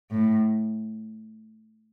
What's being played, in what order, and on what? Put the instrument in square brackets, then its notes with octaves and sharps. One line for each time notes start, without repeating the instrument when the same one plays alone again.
[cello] A2